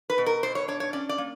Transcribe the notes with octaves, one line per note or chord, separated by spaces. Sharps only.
B4
B2
A#4
B2 C5
C#5
D4 C#5
C#5
C#4 D5
D5
A#3